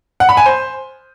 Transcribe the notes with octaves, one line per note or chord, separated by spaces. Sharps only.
F#5
B5
G#5
C5